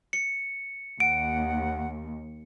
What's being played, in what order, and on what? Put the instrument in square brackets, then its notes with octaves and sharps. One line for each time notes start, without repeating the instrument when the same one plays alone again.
[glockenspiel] C#7
[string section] D#2 [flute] F#5 [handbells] D7